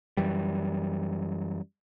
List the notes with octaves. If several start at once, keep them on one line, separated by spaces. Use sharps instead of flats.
F#2 E3 G3